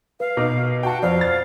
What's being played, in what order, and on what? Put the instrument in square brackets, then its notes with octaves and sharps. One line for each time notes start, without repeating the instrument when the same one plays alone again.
[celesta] B4 [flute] F5
[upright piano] B2 D#4 D6
[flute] F#4 [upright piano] G5 A5
[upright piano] F2 [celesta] C5 D5 [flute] F5
[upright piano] A6